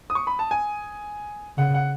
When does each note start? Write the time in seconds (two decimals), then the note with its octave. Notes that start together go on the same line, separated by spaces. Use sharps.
0.10 D#6
0.15 C#6
0.27 B5
0.39 A5
0.51 G#5
1.58 C#3 F#5
1.74 F#5